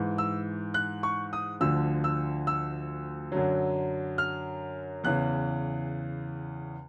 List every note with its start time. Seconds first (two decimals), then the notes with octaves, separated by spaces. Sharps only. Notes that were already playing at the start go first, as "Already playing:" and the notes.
Already playing: G#2 E3
0.18 E6
0.74 F#6
1.03 C#6
1.33 D#6
1.61 D2 D3 F3 E6
2.04 E6
2.47 E6
3.32 F#2 D3 F#3
4.18 F6
5.04 E2 C#3 E3 F#6